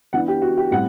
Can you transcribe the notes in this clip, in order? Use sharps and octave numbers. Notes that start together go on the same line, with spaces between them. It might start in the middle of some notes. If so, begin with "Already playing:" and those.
E3 B3 D4 F#5
G4
F#4
G4
A2 G3 C4 F#5